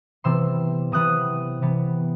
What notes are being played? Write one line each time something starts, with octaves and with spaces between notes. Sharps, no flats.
C3 E3 B3 C6 E6
C3 E3 B3 D#6 F#6
C3 E3 B3